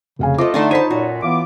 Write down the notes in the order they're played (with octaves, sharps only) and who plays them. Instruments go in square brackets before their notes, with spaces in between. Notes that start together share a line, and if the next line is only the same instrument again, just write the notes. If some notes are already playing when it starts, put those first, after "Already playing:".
[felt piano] F1 F5 G#5 [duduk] C#3
[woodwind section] A3 C5 D#5 [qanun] F4 A4 [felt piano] D6
[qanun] D3 D#5 C6 [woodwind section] A3 [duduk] D#4
[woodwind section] C5 [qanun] C#5 A5 [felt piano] B5 B6 D#7
[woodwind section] F#2 A#2 [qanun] F#4
[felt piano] E3 [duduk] B3 [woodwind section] F4 D6